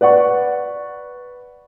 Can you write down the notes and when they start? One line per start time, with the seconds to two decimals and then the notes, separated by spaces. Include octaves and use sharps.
0.01 B4 D5 F#5 C#6